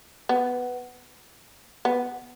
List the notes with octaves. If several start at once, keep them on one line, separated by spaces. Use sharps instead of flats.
B3
B3